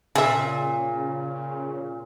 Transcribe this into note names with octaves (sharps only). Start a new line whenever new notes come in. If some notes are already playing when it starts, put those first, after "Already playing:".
A#2 C#3 G#4 E5